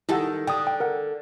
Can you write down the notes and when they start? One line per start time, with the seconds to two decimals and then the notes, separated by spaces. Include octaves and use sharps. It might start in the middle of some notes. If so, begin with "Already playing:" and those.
0.09 D#3 E4 G4 A4 F#5
0.47 D3 G5 D#6
0.67 G5
0.80 A#4 F#5